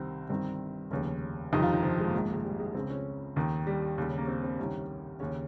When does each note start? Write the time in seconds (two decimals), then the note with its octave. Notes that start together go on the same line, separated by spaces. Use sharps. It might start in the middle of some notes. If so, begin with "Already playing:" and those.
Already playing: C2 C3 D#3 C4
0.30 G1 G2 D#3 C4
0.91 F1 D#2 C#3 C#4
1.52 G1 F2 C3 D#3 D#4
1.63 F4
1.73 D#4
1.83 F3
1.98 G#3
2.07 A#3
2.13 A#1 G#2 D#3 G#3
2.24 A#3
2.33 G#3
2.45 G3
2.60 G#3
2.75 C#2 C#3 C4
2.90 C#4
3.36 D#2 D#3
3.67 G3
3.98 D#2 C#3
4.18 A#3
4.28 C4
4.44 C4
4.59 C2 C3 D#3 C#4
5.20 D#2 C#3 C#4